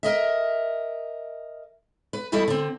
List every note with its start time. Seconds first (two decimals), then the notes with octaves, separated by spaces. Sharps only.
0.03 A#4 D#5 E5
2.13 B4
2.32 E2 G3 E4 F#4 A4 D#5
2.48 D3 C4